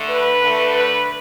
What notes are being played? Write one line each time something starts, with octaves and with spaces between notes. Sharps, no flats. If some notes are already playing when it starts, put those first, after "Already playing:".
Already playing: D3 A3
B4
D3 A3
B4